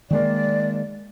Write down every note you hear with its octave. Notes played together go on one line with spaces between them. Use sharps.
D#3 G#3 A#3 D5